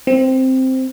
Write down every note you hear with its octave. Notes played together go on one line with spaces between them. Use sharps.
C4